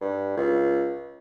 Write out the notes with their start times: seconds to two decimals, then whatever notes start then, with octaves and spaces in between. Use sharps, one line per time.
0.01 G2
0.37 C#2